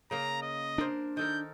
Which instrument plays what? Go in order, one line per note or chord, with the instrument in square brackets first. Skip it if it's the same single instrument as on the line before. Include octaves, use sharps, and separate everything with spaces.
[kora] C#3 A#3 [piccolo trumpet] A#5
[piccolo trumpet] D#5
[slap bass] D4 [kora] A#4 C5
[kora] D#3 A4 A#4 [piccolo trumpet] G6